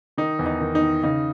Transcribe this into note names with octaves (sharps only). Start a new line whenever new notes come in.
D#3 D#4
E2
D#4
D#3
D#4
D#3
C#3 D#4